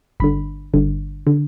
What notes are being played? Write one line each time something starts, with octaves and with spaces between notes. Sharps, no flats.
G1 G2 D3 B5
G1 G2 D3
D3